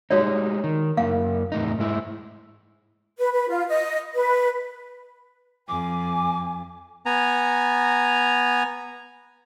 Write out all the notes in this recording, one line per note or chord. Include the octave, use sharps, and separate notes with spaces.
G3 G#3 D#4 F#4 C#5 D5
D#3
F#2 A#3 F5
E2 A2 D#4
G#2 G#3 E4
B4
B4
F4
D#5
B4
F2 G#5 D6
B3 G#5 A#5